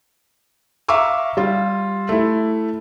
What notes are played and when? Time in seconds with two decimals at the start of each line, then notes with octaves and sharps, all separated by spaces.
0.89 E5 F5 A#5 C#6 D6 E6
1.37 G3 F4
2.09 A3 E4